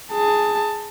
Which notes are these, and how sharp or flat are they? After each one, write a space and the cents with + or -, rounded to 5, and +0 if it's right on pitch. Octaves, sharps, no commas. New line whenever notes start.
G#4 +5 A5 +20